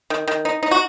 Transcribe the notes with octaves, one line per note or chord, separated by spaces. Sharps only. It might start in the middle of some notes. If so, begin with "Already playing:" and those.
D#3
D#3
D#4
D#4
F#4